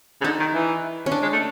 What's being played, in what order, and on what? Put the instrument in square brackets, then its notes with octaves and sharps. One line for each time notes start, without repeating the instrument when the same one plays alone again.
[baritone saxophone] C#3
[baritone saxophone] D3 [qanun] D#4
[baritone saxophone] D#3
E3
[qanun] C#4
D4
[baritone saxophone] G#3
A3